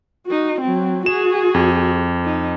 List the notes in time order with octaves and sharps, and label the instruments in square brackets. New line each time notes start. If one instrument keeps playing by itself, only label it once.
[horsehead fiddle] D#4 F#4
F#3 C4
[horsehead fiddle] F#4 G#4 [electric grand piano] E7
[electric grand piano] F2
[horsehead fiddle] D#4